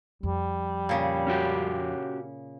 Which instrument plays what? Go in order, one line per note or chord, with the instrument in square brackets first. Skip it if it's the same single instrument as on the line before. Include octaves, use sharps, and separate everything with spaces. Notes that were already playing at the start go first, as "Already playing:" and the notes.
[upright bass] F2 [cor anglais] G3
[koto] A#2 C#3
[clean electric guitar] C#4 F#4 G4